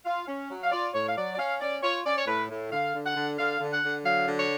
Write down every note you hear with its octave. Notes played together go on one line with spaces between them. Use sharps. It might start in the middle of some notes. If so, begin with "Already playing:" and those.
F4 F5
C#4
F#3
F5
F4 D5
A2 C#5
F5
F#3 D5
D5
C#4 F5
C#4 D5
F4 C#5
C#4 D5
C#5
A2 B4
A2
D3 F5
D3
F#5
D3
D3 F5
D3
F#5
D3
F#3 F5
D3
C#5